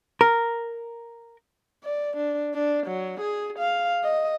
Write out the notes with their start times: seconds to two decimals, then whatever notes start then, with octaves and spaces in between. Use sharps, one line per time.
0.21 A#4
1.84 D5
2.17 D4
2.54 D4
2.87 F#3
3.21 G#4
3.59 F5
4.04 D#5